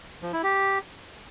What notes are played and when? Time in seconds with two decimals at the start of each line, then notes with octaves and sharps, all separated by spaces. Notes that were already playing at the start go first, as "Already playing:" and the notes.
0.23 F3
0.33 E4
0.43 G4